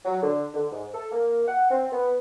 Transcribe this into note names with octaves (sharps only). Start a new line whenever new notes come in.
F#3
D3
D3
G#2
A4
A#3
F#5
C4
B3